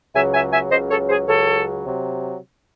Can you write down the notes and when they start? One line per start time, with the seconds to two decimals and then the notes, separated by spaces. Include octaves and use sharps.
0.14 C#2 C#3 F#3 E5 G#5
0.32 E5 G#5
0.51 E5 G#5
0.70 C#2 C#3 F#3 C5 D#5
0.90 A4 C#5
1.07 G#4 C5
1.26 C#2 C#3 F#3 A4 C#5
1.85 C3 F#3